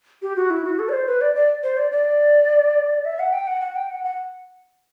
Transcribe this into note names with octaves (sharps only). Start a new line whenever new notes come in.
G4
F#4
E4
F#4
A4
D5
C5
B4
D5
D5
C5
D5
D5
E5
F#5
G5
F#5
F#5
G5
F#5
F#5